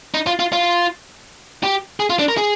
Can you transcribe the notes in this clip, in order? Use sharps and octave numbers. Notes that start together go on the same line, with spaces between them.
D#4
F4
F4
F4
G4
G#4
F4
D4
A#4
G#4